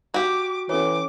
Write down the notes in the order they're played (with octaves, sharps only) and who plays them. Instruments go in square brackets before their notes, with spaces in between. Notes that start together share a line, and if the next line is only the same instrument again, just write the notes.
[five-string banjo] F#4 G4 [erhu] D6
[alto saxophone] E3 [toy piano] C#4 A4 C#5 [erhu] D6